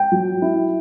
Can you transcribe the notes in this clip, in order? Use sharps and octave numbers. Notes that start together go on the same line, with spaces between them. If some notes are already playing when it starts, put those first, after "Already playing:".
Already playing: G5
F#3
E4